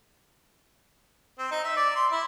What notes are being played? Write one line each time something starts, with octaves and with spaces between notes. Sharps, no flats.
C4
D#4
E5
D5
C6
E4